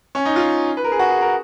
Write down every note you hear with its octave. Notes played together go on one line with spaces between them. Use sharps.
C#4
D#4
F4
B4
A#4
G#4
F#4
G#4
A#4